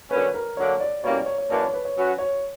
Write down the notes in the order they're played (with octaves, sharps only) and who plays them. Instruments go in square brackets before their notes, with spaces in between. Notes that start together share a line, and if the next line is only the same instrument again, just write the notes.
[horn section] D3 F#3 A#3 C#4 [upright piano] B4
[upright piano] A#4
[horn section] D3 F#3 A#3 D4 [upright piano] C#5
[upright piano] D5
[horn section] B2 G3 A#3 C#4 E4 [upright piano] C#5
[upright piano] D5
C#5
C#5
[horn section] F#2 E3 A#3 D4 [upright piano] D5
[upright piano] C#5
B4
C#5
[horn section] F#3 C#4 F#4 B4
[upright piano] C#5